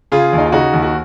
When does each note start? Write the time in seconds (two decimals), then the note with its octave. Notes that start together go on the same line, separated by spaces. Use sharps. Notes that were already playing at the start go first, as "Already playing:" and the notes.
0.12 C#3 F4 G#4
0.33 D#2
0.38 D#4
0.46 F4
0.52 C#3 D#4 F#4
0.73 D#2
0.82 F#4